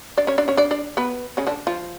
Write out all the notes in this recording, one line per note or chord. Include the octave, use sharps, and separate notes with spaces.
D4 D5
C#4 C#5
D4 D5
C#4 C#5
D4 D5
D4 D5
B3 B4
C#3 C#4
D3 D4
F3 F4